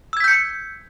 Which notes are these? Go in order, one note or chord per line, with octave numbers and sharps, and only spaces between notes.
E6 G6 G#6 B6 C#7